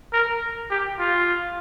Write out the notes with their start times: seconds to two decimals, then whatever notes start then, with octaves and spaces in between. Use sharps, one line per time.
0.13 A#4
0.71 G4
0.99 F4